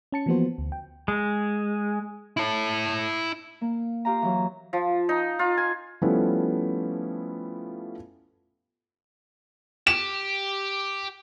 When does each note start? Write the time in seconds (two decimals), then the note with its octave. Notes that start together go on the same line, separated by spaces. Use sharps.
0.12 C#4 A5 C#7
0.26 E3 F3 A#3 B3 F#4 C5
0.58 D2
0.72 G5
1.08 G#3
2.37 E4 A5
3.61 A#3
4.05 F4 G4 F5 A#5
4.22 E3 F#3
4.73 F3
5.09 D#4
5.39 F4
5.57 G#5
6.02 F3 G3 A3 B3 C#4 E4
9.87 G4 E7